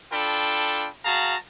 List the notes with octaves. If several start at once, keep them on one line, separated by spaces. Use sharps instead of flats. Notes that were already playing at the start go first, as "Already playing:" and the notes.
D4 F4 A4 G5 B5
F#4 G#4 F5 A5 A#5